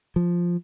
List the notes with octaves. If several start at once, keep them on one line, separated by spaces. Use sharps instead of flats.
F3